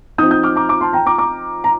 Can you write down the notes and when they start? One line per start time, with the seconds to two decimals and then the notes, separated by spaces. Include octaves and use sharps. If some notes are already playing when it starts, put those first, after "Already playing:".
0.18 F3 C4 D#4 D#6 G6
0.31 D#6 G6
0.43 D6 F6
0.56 A#5 D6
0.69 A#5 D6
0.81 A5 C6
0.93 G5 A#5
1.06 A#5 D6
1.18 A#5 D6
1.64 A#5